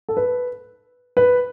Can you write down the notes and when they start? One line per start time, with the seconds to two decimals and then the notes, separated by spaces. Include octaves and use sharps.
0.09 A4
0.17 B4
1.17 B4